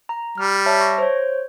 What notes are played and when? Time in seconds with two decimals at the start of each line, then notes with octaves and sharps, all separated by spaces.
0.09 A#5
0.38 G3 F6
0.66 C#5 E5 A5
0.81 C#6 A#6
0.98 C5 C#5